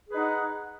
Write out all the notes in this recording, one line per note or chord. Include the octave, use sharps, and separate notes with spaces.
D#4 G#4 B4 F#5